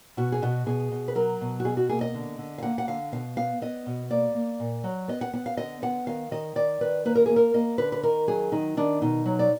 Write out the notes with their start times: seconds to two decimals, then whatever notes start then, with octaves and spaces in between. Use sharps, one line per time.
0.17 B2 F#4
0.32 G#4
0.42 B2 F#4
0.66 B2 G#4
0.92 B2
1.08 B4
1.15 F#3 A#4
1.41 B2
1.60 F#4
1.65 B2 G#4
1.77 F#4
1.89 A#3 G#4
2.01 D#5
2.14 D3
2.38 D3
2.58 F5
2.63 A#3 F#5
2.78 F#5
2.87 D3 F5
3.12 B2 F5
3.36 B3 F5
3.62 B3 D#5
3.86 B2
4.10 A#3 D5
4.35 A#3
4.60 A#2
4.84 F#3
5.08 B3 D#5
5.21 F#5
5.34 B3 F#5
5.46 F5
5.57 D3 D#5
5.82 B3 F#5
6.07 D#3 F5
6.31 D#3 D#5
6.55 D#3 D5
6.81 D#3 B4
7.05 A#3 B4
7.15 A#4
7.26 A#3 G#4
7.36 A#4
7.54 A#3 D#5
7.78 D3 B4
7.92 B4
8.03 D#3 A#4
8.27 F#3 G#4
8.52 D#3 D#4
8.77 D#3 D4
9.02 B2 D#4
9.25 F#3
9.39 D5